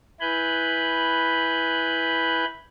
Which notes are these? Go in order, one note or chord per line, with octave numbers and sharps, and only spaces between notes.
E4 B4 G#5 B5 F#6 G6